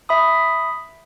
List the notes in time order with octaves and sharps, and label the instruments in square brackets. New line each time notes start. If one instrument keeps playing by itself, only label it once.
[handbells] E5 B5 D#6